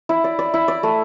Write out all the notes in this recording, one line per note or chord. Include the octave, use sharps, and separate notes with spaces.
E4
D5
D5
E4
D5
A3